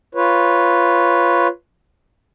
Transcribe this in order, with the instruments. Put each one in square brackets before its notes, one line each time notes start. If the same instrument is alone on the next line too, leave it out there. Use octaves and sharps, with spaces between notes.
[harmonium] F4 B4 C#5